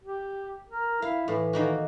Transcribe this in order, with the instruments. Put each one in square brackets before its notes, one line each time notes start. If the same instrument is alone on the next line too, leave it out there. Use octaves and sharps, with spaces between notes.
[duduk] G4
A#4
[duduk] E4 [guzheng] F5
[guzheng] A2 [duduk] E3
[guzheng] D#3 A#3 F#4